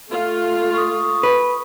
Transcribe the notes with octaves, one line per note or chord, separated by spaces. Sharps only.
A3 F4
C#6 D#6
B4